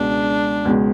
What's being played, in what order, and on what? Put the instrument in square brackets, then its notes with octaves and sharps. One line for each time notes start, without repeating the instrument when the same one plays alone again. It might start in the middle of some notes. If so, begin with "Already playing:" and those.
Already playing: [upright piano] C#2 B2 G#3 [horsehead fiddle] D4
[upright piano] C#2 B2 G#3